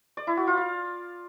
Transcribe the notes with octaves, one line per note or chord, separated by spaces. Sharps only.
D5
E4
F#4
F4
F5